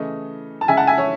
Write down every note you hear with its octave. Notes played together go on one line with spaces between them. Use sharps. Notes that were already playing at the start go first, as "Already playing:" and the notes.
Already playing: C#3 E3 A3 D#5
A5
C#3 G#3 E5 G#5
F#5 A5
E5 G#5
C#5 E5